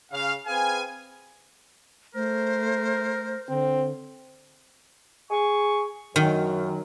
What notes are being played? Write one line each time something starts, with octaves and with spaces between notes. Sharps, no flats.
C#3 F5
C4 G#4 B4 F5 G#5
A3 A#4 C5
D3 C4
G#4 C#6
F#2 D#3 F#3